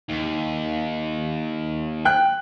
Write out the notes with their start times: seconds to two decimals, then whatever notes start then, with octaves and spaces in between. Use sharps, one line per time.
0.09 D#2
2.05 G5 F#6